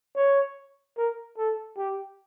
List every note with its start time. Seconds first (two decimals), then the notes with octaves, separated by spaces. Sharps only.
0.16 C#5
0.97 A#4
1.37 A4
1.77 G4